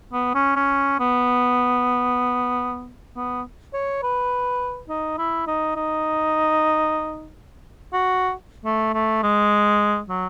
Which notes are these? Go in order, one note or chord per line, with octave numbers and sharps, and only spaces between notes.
B3
C#4
C#4
B3
B3
C#5
B4
D#4
E4
D#4
D#4
F#4
A3
A3
G#3
F#3